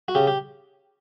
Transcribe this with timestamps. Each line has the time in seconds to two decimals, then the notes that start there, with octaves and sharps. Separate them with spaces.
0.08 F#4
0.15 C#3 G4
0.27 G4